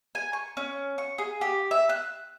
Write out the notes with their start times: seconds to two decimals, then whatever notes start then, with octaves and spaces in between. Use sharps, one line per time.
0.15 G#5
0.33 C#6
0.57 C#4
0.98 C#6
1.18 G#4
1.41 G4
1.71 E5
1.89 F#6